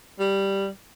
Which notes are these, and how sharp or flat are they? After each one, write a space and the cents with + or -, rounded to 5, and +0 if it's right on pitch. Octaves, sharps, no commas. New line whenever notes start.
G3 +0